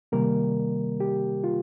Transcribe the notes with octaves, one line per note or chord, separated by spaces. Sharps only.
C3 D#3 G3 A#3 A#4
G4
F4